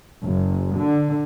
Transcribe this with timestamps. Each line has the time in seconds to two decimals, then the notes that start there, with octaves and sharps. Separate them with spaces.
0.24 F#1
0.78 D3